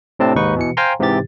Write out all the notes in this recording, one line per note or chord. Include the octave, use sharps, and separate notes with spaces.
A2 C3 C4 D4 A5
D#2 G#2 D#4 B4 C#6
B2 E3 C#7
C5 F5 G5 G#5 A#5 C6
G#2 C3 E3 G4 A6